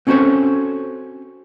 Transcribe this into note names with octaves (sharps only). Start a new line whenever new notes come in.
C4 C#4 F#4 A4 C5 C#5